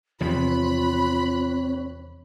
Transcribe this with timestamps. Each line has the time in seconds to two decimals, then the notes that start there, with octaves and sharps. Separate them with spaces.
0.20 E2 C3 F3 C4 F4 C#5 B5 F#6